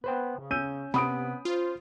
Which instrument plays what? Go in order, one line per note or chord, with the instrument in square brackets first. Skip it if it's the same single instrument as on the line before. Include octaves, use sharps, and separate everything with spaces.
[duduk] B3 [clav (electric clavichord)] B4 C5 G5
[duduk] C#3
[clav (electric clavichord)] C#4 [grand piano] E6 G6 D#7
[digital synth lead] C3 [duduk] B3 [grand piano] B5 D#6 D7
[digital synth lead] F4 [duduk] C5